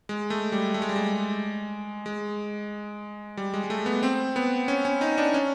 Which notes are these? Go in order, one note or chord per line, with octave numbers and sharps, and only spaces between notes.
G#3
A3
G3
A3
G#3
G3
G#3
G#3
G3
G#3
G#3
A3
B3
C4
B3
C#4
C#4
D#4
D4
C#4